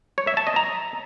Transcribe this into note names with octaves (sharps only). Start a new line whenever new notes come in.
C#5
E5
A5
D#5
A#5